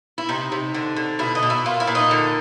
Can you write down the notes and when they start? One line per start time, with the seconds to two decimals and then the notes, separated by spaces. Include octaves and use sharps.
0.18 E4
0.29 C3 D#4
0.52 C3
0.74 D3
0.97 D3
1.19 B2 E4
1.35 D#4
1.43 B2
1.50 E4
1.66 A#2 F4
1.80 E4
1.87 A#2
1.95 D#4
2.11 D3